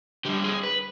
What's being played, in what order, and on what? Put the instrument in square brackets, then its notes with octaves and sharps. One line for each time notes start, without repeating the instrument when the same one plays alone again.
[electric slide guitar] D3 G3 G4
G#4
B4